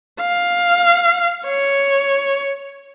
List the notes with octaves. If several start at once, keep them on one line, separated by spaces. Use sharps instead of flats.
F5
C#5